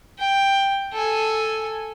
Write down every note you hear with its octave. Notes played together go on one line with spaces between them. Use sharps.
G5
A4 G#5